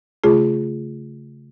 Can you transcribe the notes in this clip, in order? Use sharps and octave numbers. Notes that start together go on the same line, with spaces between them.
C#3 A3 F4 G#4